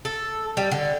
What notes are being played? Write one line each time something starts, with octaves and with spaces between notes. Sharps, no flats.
A4
G3
D3